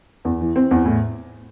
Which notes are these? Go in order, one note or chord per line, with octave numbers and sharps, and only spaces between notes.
E2
E3
C4
E2
A2